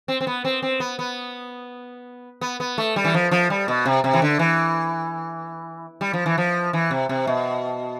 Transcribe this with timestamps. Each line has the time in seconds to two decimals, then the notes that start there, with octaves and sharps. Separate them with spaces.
0.08 C4
0.21 C4
0.27 B3
0.45 C4
0.62 C4
0.80 B3
0.99 B3
2.41 B3
2.60 B3
2.78 A3
2.96 G3
3.05 E3
3.14 F3
3.31 F3
3.50 G3
3.68 B2
3.86 C3
4.04 C3
4.13 E3
4.22 D3
4.39 E3
6.01 G3
6.13 F3
6.26 E3
6.38 F3
6.73 E3
6.91 C3
7.09 C3
7.27 B2